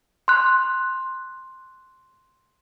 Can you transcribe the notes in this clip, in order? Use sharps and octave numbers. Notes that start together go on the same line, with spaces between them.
C6 F#6